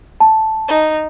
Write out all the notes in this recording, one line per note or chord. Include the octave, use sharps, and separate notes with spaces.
A5
D#4